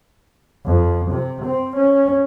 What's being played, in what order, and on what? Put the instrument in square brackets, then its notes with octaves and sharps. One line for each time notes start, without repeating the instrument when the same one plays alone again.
[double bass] F2
C3
C4
C#4